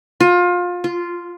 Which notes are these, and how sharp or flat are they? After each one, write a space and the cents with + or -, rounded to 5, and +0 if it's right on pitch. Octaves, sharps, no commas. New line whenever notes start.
F4 +25
F4 -5